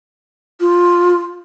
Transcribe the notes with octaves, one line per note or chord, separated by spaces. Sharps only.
F4